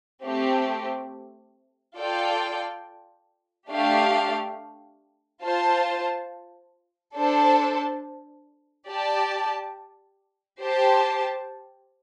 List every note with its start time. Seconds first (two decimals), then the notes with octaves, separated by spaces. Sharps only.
0.25 A3 C4 G4
1.97 F4 A4 D5 G5
3.69 A3 D4 G4 F5
5.42 F4 C5 A5
7.16 D4 A4 C5 A5
8.88 G4 D5 A5
10.61 G4 C5 A5